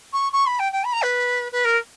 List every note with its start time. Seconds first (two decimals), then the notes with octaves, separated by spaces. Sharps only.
0.13 C#6
0.33 C#6
0.46 B5
0.59 G5
0.73 G5
0.84 B5
0.93 A#5
1.02 B4
1.52 B4
1.65 A#4